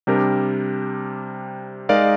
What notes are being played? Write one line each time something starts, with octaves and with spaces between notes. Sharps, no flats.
C3 G3 D4 G4 A#4
G#3 D#4 A#4 D5 F5